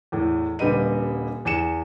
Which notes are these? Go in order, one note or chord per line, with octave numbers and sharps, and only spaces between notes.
E2 A2
D#1 D3 G3 B4 D#5 D#7
E2 G#5 C#7 E7